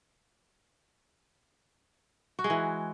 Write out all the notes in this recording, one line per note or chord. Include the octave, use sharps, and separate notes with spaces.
F#4
G#3
E3